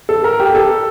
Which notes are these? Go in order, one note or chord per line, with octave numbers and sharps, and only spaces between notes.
A4
A#4
G4
A4